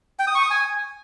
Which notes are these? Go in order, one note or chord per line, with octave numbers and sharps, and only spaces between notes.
G5
D#6
C#6
D#6
G#5